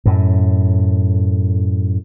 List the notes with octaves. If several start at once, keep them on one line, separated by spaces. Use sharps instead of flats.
F#2 A2